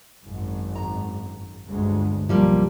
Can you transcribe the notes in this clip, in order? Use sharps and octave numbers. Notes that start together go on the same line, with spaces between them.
G#1 F#2
A#5
G1 D2 G#3
F#1 B1 F3 G3 A#3